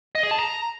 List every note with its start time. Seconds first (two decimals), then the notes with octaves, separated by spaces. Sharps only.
0.15 D#5
0.23 G#4
0.31 A5
0.39 A#5